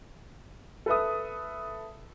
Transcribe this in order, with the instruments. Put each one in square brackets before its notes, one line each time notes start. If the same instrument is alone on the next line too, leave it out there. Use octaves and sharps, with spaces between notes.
[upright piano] A4 B4 E5 D#6